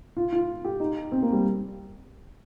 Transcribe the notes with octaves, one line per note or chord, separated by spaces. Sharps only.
F4
F4
G4
D#4
C4
A#3
G3